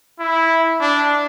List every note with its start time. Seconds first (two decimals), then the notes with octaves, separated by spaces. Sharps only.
0.20 E4
0.81 D4